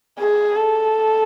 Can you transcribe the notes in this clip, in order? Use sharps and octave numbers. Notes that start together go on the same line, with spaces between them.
G#4
A4